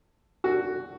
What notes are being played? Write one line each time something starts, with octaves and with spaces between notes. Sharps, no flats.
F#4